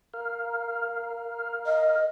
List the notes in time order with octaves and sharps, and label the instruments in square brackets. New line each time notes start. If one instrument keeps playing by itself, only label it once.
[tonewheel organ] A#4 F5
[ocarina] D#5